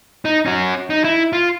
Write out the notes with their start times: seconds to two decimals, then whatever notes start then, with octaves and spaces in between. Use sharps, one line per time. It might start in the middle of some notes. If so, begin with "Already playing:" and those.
0.25 D#4
0.46 C#4 F#4
0.90 D#4
1.04 E4
1.33 F4